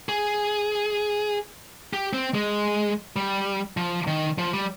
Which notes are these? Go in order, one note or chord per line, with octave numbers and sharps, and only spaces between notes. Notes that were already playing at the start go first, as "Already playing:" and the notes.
G#4
G4
C4
G#3
G3
F3
D#3
F3
G3